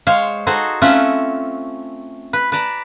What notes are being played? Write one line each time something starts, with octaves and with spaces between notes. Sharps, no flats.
G#3 C5 C#5 F5
D#4 F#4 G#4 A4 C5
A3 C4 C#4 F4 E5 F#5
B4
B4 D5 A5 A#5